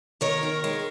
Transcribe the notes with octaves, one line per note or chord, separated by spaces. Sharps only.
D#3 A#4 C#5
D#3
G#3